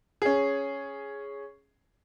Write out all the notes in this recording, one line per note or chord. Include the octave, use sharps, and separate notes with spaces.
C#4 G#4